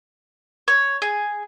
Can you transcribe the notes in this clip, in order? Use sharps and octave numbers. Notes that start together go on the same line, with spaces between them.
C#5
G#4